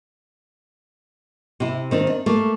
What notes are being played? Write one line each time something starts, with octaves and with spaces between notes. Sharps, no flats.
C3 E4
D#3 C4 D4
D4
A3 A#3